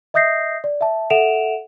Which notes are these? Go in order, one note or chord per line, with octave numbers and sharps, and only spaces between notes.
D#5 E5 D#6 G6 A#6 C7
D5
E5 A5
A4 E5 F#5 D7 E7 F7